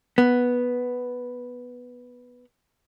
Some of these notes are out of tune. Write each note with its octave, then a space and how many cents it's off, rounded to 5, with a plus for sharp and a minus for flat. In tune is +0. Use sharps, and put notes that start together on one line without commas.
B3 -5